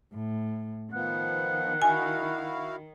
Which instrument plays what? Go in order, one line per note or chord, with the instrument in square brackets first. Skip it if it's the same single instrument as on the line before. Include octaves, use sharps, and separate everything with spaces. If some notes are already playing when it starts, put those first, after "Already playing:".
[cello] A2
[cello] D#3 [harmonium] F3 B3 [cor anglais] F#5
[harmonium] E4 F#4 F5 [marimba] G#5